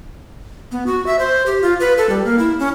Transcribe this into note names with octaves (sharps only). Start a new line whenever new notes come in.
B3
F#4
E5
C5
G4
F4
B4
A4
G3
A#3
E4
C#4